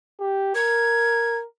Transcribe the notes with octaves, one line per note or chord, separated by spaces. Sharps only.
G4
A#4 G#6